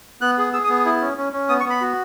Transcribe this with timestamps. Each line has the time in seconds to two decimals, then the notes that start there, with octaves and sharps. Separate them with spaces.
0.21 B3 F#6
0.38 G#4
0.53 G#4 E6
0.64 D#6
0.69 B3
0.85 E4
1.01 C#4
1.17 C#4
1.33 C#4
1.49 B3 D#6
1.60 C#6
1.65 B3 B5
1.81 F#4